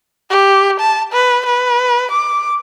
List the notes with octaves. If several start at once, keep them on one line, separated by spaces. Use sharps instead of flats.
G4
A5
B4
B4
D6